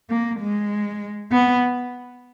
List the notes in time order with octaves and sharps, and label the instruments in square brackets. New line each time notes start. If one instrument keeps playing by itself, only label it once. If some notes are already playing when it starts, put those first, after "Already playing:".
[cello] A#3
G#3
B3